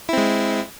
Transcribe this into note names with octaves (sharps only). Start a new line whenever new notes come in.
G#3 C4 E4